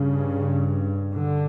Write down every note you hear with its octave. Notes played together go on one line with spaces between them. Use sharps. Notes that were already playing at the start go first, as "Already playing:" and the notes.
Already playing: G2 C#3
D3